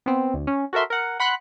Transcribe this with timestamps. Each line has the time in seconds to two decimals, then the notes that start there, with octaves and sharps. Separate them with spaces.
0.06 B3 C4
0.34 D2
0.47 C#4
0.73 F#4 A4 A#4 E5 C6
0.90 A#4 F#5
1.20 F#5 B5 C6 F#6